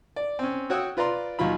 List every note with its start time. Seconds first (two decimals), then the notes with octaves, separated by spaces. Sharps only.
0.16 D5
0.39 C4 C#4
0.70 F#4 C#5 F#5 G5 D#6 E6
0.97 F4 B4 D5 A#5 C6
1.39 D#2 F#3 F4 B5